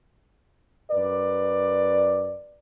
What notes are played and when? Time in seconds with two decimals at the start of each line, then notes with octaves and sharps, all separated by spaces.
0.90 F#2 B4 D5